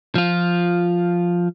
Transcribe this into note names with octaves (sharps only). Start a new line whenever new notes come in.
F3 F4